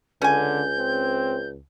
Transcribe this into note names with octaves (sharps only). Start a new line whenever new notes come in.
C#2 D3 C#4 G#5 G6
C4